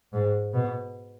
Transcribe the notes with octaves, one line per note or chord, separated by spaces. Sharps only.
G#2
B2